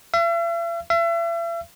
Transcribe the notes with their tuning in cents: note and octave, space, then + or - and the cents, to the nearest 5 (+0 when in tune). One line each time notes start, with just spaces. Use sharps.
E5 +45
E5 +40